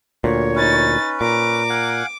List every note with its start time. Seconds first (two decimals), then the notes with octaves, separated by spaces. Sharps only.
0.24 D2 A#2 C#5
0.55 C#4 D#4 B4 A6
1.21 A#2 A#5 D6
1.70 F5 F#5 G#5